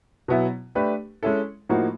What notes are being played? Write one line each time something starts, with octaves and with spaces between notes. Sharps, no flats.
B2 F#3 B3 E4
A3 D4 G4 B4
G#3 C#4 E4 A4
A2 F3 A#3 D#4 F#4